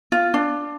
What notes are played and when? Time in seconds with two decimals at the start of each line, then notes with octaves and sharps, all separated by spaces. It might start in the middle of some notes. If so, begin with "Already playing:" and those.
0.12 F4
0.34 D4